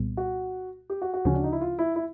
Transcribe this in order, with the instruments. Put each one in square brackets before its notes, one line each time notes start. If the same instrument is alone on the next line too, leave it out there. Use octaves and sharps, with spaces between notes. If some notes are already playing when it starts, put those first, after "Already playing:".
Already playing: [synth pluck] C2 A#2 G3 B3
[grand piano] F#4
G4
F#4
F#4
[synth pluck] D2 C#3 F3 [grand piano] C#4
[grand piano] D4
D#4
E4
F4
E4
E4